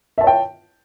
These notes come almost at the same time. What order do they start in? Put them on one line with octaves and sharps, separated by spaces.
E5 A5 C#5 G5